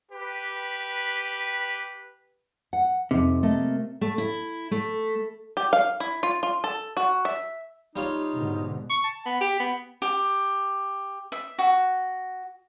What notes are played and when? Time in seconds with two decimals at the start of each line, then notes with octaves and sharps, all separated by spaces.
0.12 G4 B4
2.73 F#5
3.11 F2 C3 D#4
3.43 A3 A#3 D#5
4.01 A3
4.18 E4
4.71 A3
5.57 G4
5.73 F5
6.00 E4
6.23 F4
6.43 F4
6.64 A4
6.97 F#4
7.25 E5
7.96 G3 D#4 F4 C#5
8.35 G#2 B2 D3
8.90 C#6
9.04 A5
9.26 B3
9.41 G4
9.60 B3
10.02 G4
11.32 E5
11.59 F#4